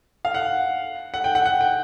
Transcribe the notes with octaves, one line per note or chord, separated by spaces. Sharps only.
F5
F#5
F#5
G5
F#5
F#5
G5